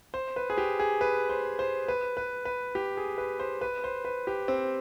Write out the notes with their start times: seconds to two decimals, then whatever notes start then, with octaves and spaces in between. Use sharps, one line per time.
0.14 C5
0.36 B4
0.50 G#4
0.58 G4
0.79 G#4
1.01 B4
1.30 C5
1.59 C5
1.88 B4
2.17 B4
2.45 B4
2.75 G4
2.97 G#4
3.18 B4
3.40 C5
3.61 B4
3.84 C5
4.05 B4
4.27 G4
4.48 C4